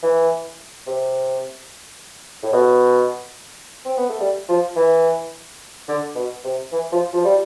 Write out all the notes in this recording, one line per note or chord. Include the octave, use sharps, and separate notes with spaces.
E3
C3
A2
B2
C4
B3
A3
G3
F3
E3
D3
B2
C3
E3
F3
F3
G3